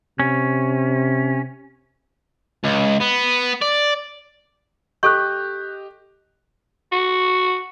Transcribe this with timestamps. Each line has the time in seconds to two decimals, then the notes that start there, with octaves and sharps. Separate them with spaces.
0.20 C3 C#4
2.64 C#2
3.00 B3
3.62 D5
5.03 G4 A4 D#5 C#6 F#6 G6
6.92 F#4